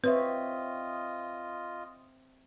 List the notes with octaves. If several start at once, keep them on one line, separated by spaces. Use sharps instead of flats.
C4 F4 B4 C#5 D#5 E5